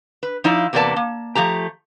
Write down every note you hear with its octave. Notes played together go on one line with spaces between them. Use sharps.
B4
F3 D#4 E4 D5 F5
E2 C3 A#3 B3 D5 A5
A#3
F3 A3 G4 A#5